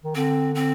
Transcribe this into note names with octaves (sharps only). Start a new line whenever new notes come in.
D#3
D3 C4
C4